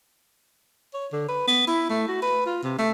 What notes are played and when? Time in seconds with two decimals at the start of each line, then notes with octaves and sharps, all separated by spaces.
0.94 C#5
1.12 D3
1.28 B4
1.47 B3
1.67 E4
1.89 A3
2.08 F#4
2.22 B4
2.46 F4
2.63 C3
2.79 A3